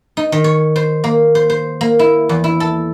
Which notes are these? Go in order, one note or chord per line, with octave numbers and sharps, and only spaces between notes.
D#4
D#3
C#5
C5
A#3
C5
C5
A#3
E4
E2
E4
A4